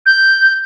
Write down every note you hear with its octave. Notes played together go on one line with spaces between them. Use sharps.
G6